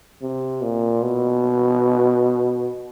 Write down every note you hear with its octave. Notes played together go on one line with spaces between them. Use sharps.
C3
A#2
B2